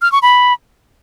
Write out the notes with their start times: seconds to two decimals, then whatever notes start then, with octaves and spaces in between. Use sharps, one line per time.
0.02 F6
0.12 C#6
0.22 B5